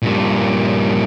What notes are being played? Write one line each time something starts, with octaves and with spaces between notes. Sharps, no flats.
G2 A#2